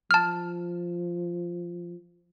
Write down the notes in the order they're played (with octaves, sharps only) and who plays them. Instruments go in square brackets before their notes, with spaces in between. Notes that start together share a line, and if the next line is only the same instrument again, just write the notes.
[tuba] F3 [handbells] A5 F6